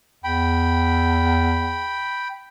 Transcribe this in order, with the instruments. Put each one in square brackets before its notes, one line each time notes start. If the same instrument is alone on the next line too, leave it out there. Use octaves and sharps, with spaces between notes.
[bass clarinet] E2 [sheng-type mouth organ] G5 B5